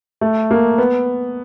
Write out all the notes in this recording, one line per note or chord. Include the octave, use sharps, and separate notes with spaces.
A3
A#3
B3